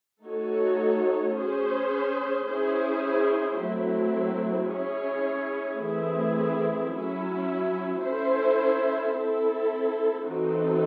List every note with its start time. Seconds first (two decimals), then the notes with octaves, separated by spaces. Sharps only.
0.23 A3 D#4 F#4 A4 C#5
1.35 C#4 G#4 C5
2.46 C#4 E4 G#4 C5
3.57 F#3 A3 C4 E4
4.69 C#4 E4 G#4 C#5
5.80 E3 A3 C4 E4 G#4
6.91 F#3 C#4 E4
8.03 C#4 E4 A4 C5
9.14 C4 E4 A4
10.25 E3 C4 D#4 F#4 A4